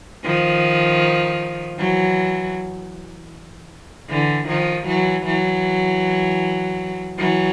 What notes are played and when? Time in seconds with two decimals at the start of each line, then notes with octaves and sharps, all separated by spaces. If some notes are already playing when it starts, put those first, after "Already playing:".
0.25 D#3 F3
1.79 E3 F#3
4.10 D3 E3
4.48 D#3 F3
4.87 E3 F#3
5.26 E3 F#3
7.18 E3 F#3